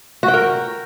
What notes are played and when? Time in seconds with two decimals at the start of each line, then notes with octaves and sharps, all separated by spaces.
0.23 F#4
0.28 G5
0.34 A#4